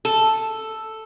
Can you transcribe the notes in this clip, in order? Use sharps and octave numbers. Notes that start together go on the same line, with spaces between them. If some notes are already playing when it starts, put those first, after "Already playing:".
A4